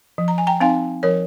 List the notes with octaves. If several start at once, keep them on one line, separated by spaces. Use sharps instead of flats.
F3
A#5
G#5
G5 A#5
C4 D#4 F5 G#5
F3 A#4 C#5